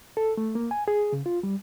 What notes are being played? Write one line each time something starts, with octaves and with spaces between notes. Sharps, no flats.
A4
A3
A#3
G#5
G#4
C#3
F4
G3